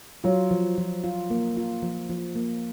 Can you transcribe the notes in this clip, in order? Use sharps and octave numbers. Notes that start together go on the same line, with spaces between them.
F#3 F4
F3
F3
F4
A#3
F4
F3
F3
A#3